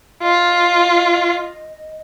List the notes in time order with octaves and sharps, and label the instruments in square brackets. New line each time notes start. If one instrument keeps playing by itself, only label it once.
[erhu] F4 [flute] D#5